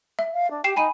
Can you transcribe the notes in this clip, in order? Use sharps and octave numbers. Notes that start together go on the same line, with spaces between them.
E5
F5
D4
G4 G5 C7 E7
D#4 G#5 B5 D#7